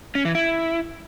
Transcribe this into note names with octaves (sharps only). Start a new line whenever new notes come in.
C#4
E3
E4